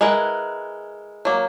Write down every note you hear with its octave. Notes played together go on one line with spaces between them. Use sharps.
G#3 E4 A#4 B4 F#5
F#3 A#3